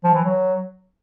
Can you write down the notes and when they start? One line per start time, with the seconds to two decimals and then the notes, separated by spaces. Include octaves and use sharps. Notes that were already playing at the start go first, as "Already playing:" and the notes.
0.04 F3
0.14 E3
0.24 F#3